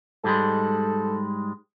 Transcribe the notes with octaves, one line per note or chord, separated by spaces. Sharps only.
G#2 G3 G#3 A4